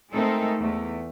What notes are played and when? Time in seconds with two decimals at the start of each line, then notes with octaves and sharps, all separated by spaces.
0.12 G#3 A3 C4 D#4 A4 A#4
0.60 E2 A3